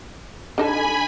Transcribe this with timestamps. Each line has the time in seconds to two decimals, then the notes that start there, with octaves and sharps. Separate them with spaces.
0.58 D3 D#4 A4 G#5 B5